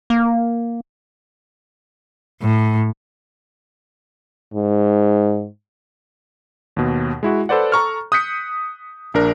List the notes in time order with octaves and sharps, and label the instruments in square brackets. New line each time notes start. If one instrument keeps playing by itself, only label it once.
[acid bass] A#3
[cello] A2
[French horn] G#2
[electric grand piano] D#2 B2
G#3 E4 F#4
A4 B4 C5 D5 F#5
A4 A#5 C#6 F6
D#6 F#6 G6 B6 C#7
A#1 D4 A#4